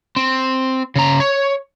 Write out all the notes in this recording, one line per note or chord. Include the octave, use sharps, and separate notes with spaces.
C4
C#3 A#5
C#5